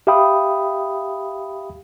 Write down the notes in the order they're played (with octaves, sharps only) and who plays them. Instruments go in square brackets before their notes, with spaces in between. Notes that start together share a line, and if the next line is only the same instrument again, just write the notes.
[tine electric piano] G4 E5 F5 G5 B5 D#6